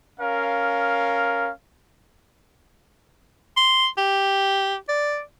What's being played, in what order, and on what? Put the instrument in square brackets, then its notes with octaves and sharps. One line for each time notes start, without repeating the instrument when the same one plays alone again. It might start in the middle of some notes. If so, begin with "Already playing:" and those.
[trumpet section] C#4 A#4 F5
[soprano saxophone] C6
G4
D5